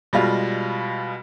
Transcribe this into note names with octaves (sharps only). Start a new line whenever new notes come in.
B2 G3 G#3 F4